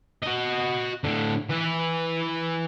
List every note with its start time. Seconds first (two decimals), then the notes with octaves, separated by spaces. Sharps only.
0.23 F#4 D#5
1.04 A2 D3
1.50 E3 B4